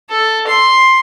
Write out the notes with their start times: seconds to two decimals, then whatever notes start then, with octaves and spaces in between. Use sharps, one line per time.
0.10 A4
0.47 C6